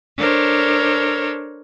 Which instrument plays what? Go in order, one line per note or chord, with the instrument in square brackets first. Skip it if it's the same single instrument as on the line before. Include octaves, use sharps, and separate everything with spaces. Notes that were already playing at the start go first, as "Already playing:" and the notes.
[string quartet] D4 A4 A#4 C5 C#5